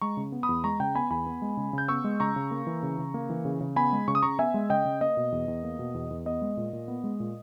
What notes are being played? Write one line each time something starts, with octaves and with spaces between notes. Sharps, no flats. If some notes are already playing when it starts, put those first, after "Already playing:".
G#3 A#5 C#6
C#3
B3
B5 D#6
E2
G#3 A#5 C#6
C#3 G5 A#5
B3 G#5 B5
E2 G#5 B5
B3
G#3
C#3
C#3 G6
B3 C#6 E6
G#3
C#3 A#5 C#6
C#3
A#3
E3
C#3
C#3
A#3
E3
C#3
C#3
B3 G#5 B5
G#3
C#3 C#6
D#6
C#3 A#5 C#6
B3 E5 G#5
G#3
C#3 D#5 G5
C#3
A#3 D#5
B2
E2
E2
A#3
B2
E2
E2
B3 D#5
G#3
A#2
A#2
B3
G#3
A#2